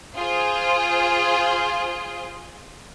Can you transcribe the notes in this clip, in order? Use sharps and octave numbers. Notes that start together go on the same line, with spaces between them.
F4 G#4 C5